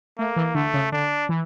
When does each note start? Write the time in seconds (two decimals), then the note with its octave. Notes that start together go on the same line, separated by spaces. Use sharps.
0.18 A3 A#3
0.36 E3
0.55 D3 A3
0.74 C#3
0.92 D3 D4
1.29 E3